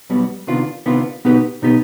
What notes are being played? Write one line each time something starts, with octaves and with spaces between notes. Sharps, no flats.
B1 B2 G3 B3
C3 D#3 B3 D4 F4
C3 D#3 B3 D4 F4
B2 B3 D#4 G4 B4
B2 B3 D#4 G4 B4